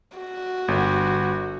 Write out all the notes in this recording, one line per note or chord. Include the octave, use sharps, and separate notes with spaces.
F#4
G1